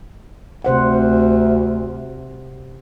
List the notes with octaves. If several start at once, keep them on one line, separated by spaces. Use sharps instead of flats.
D2 C3 C5 F#5